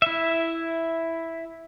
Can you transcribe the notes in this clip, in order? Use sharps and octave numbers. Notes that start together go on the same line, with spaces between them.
E4 E5